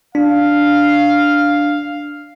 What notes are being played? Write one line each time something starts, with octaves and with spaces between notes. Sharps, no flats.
D4 F5